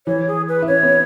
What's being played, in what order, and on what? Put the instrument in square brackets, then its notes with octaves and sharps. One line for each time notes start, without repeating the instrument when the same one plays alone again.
[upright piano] E3 [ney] C#5
[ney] G#4
B4
[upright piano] E4
[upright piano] C#4 [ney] C#5
[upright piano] B3